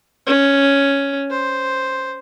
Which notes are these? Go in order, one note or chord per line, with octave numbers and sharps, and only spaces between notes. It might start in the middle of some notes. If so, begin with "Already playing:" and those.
C#4
C5